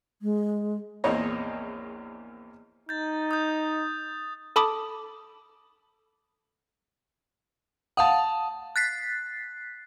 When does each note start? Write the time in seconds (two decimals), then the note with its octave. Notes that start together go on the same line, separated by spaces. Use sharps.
0.22 G#3
1.04 A#1 E2 A#3 C4 C#5 D#5
2.89 D#4 G6 A6
3.31 D#6 G6
4.56 A4 A5 B5 D6 D#6
7.97 F5 F#5 A5 D#6
8.76 F#6 A6 B6 C7